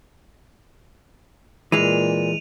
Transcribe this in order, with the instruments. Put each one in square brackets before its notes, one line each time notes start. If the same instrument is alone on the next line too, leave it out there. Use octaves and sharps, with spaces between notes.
[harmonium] A#2 [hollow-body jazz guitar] E3 G#3 [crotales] D#7 F7